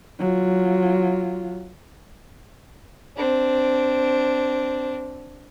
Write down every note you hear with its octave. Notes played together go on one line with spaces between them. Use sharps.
F#3 F4
C4 D4